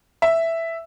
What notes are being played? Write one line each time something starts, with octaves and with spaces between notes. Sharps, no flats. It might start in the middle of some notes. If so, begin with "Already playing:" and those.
E5